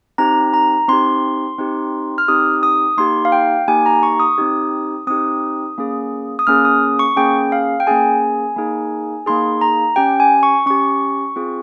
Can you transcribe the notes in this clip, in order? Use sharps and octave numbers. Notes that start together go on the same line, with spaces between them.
C4 D#4 G4 A#5
A#5
C4 D#4 G4 C6
C4 D#4 G4
F6
C4 D#4 G4 D#6
D#6
A#3 D#4 G4 C6
F5
G5
A#3 D#4 G4 G#5
A#5
C#6
D#6
C4 D#4 G4
C4 D#4 G4 D#6
A#3 C#4 G#4
D#6
A#3 C#4 G#4 F6
D#6
C#6
A#3 C#4 G#4 G5
F5
G5
A#3 C#4 G#4 G#5
A#3 D#4 G#4
A#3 D#4 G#4 C6
A#5
C#4 G4 G5
G#5
C#6
C#4 G4 C#6
C4 F4 G#4